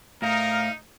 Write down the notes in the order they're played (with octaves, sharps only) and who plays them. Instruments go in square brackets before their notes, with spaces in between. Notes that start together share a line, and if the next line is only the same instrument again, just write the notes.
[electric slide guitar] A2 [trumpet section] D#4 [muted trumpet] A#4 [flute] F5